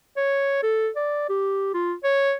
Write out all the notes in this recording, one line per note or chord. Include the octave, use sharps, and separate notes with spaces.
C#5
A4
D5
G4
F4
C#5